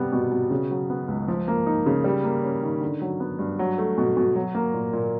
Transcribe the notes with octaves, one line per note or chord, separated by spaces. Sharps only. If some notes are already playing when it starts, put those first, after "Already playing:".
Already playing: C3 G3 B3
B2
B2
C#3
F#3
B3
C#2
F3
A#3
D#4
C#3
G3
A#3
C#4
D#3
D3
F#3
B3
G2
F#3
A3
B2
B2
F#3
A#3
A#2
A#2